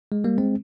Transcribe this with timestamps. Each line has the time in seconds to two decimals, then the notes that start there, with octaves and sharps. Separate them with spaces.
0.12 G#3
0.24 G3 A#3
0.38 G#3 C4